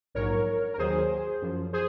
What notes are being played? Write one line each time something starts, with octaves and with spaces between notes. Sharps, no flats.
A#1 G#2 F#3 A#4 C#5
A#4
D#2 D#3 F#3 G#4 C5
F#2 F3
G#4 C5